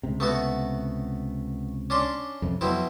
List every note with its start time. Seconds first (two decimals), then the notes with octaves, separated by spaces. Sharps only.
0.03 C#2 C3
0.20 A3 B3 F#4
1.90 C#4 D4 C6
2.42 F2 C3
2.61 F2 B2 F#3 C4 E4